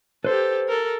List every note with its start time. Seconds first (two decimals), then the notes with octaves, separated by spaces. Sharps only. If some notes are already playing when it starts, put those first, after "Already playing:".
0.24 G4 A4 B4 C5
0.68 A4 A#4